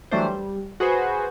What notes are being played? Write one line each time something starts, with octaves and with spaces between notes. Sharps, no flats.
E3 F#3 G3 A3 D4 C5
G3
F#4 G#4 B4 C5